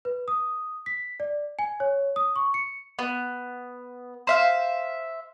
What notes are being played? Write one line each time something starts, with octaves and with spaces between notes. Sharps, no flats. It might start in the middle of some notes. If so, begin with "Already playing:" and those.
B4
D#6
B6
D5
G#5
C#5
D#6
C#6
C#7
B3
C5 E5 F5